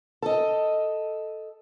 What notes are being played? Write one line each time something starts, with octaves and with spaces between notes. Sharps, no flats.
A4 D#5